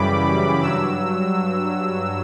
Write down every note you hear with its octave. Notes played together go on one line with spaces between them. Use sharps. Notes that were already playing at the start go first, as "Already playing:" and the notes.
Already playing: F#2 C#3 E3 G3 B5 D6
G2 F#3 E6